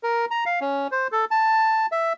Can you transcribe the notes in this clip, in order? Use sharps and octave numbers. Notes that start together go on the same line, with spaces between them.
A#4
A#5
F5
C#4
C5
A4
A5
E5